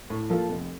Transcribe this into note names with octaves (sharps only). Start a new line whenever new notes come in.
A2
F3 A#3 F4 A4
F1